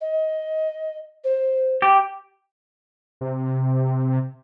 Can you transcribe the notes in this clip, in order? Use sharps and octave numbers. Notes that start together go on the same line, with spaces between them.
D#5
C5
G4
C3